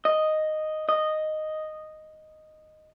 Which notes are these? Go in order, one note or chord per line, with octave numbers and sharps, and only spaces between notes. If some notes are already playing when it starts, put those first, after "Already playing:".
D#5
D#5